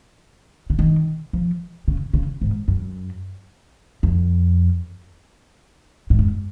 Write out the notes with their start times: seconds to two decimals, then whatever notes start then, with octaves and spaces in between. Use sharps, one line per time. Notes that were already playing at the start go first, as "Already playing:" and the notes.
0.70 C#3
0.79 D#3
1.33 F3
1.88 C#3
2.13 C#3
2.42 G#2
2.68 F#2
4.03 F2
6.10 G#2
6.19 F#2